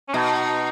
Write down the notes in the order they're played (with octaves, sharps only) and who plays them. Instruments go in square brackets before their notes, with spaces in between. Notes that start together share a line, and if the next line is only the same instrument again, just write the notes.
[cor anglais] C#4
[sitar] B2 [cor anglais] D#4